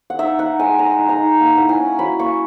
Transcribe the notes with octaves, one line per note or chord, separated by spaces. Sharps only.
F#5
D#4 E5
D#4 F#5
G#3 G#5
G#3 A#5
D#4
A#5
D#4
A#3
E4 F#5
G#5
C#4
F#3 B5
A#3 C#6